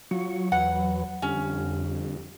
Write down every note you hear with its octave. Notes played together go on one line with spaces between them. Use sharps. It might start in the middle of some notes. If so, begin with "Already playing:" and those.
F#3 F4 F#4 C#6
E2 B4 F#5
F2 D3 G3 C#4